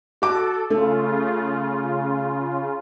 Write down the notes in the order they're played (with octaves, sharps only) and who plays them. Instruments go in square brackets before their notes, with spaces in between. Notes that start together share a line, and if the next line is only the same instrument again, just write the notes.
[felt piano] F#4 D6 [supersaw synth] A4
[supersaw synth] C#3 F4 [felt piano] A3